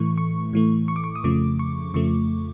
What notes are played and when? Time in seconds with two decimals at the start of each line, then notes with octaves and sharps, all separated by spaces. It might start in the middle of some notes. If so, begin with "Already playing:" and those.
Already playing: A2 E3 A3 C#6
0.18 C#6
0.53 A2 E3 A3
0.88 C#6
0.96 D6
1.04 C#6
1.16 D#6
1.24 F2 C#3 F3 A3 D6
1.59 C#6
1.94 F2 C#3 F3 A3 C#6